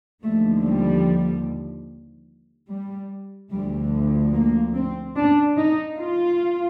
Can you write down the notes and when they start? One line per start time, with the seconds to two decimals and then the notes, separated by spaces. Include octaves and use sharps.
0.24 D#2 D3 F3 A3
0.65 G3
2.70 G3
3.51 D2 D3 F3 G3
4.34 A#3
4.75 C4
5.16 D4
5.57 D#4
5.98 F4